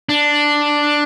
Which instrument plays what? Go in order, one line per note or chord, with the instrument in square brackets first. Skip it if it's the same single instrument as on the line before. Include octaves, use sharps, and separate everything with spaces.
[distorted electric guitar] D4